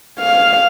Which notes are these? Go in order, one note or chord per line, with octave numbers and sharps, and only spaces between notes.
F5